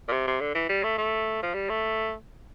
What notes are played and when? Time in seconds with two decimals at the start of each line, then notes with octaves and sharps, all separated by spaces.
0.08 A#2
0.12 C3
0.27 C3
0.41 D3
0.55 E3
0.69 G3
0.83 A3
0.98 A3
1.43 F3
1.54 G3
1.69 A3